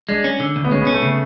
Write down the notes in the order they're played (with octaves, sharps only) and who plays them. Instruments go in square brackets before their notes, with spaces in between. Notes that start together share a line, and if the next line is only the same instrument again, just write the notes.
[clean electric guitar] G#3 [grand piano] D4
[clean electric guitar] C#4
D3
D2
[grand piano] B3
[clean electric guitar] G#3 [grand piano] C#4
[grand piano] B3
[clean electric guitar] C#4
[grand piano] A3
[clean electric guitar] C#3